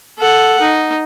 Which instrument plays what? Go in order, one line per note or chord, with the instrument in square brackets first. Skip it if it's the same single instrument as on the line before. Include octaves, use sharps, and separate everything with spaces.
[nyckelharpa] A4 F#5
D#4